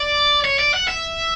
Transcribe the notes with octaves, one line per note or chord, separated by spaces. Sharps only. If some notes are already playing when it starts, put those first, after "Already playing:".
Already playing: D5
C#5
D5
F#5
E5